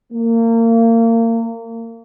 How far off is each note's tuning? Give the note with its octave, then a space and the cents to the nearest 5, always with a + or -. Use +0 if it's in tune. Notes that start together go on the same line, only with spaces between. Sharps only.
A#3 -30